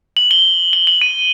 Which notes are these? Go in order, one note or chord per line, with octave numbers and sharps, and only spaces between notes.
F#7
G7
G7
F#7
D#7